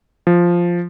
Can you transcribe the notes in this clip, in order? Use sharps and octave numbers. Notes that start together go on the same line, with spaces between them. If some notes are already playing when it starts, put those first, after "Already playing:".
F3